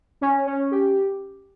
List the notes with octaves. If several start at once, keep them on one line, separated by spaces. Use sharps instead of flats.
C#4
C#4
G4